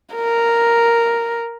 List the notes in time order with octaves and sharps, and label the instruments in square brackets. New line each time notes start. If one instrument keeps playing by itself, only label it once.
[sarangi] A#4